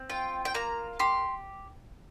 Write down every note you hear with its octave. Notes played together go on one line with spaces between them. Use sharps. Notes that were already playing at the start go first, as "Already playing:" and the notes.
Already playing: C4
F4 G5
G5
A#3 A#5
G4 C6